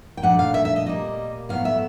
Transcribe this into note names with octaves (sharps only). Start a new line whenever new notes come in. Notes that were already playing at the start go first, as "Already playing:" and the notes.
G5
A#2 F3 A3 D4 F#5
F5
E5
E5
D#5
A#2 G3 A#3 D#5
A2 F#3 B3 F5
E5